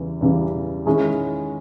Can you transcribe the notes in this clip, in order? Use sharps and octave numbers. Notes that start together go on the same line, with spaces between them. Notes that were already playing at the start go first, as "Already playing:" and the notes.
Already playing: E2 C#3 E3 G3
E2 C#3 E3 G3
D#3 G#3 C#4 E4 G#4